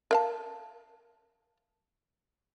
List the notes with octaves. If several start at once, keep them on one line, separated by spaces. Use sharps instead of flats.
A#4 F5 A5